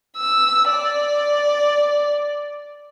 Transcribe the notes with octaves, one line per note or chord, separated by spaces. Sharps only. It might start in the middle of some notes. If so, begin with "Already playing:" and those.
E6
D5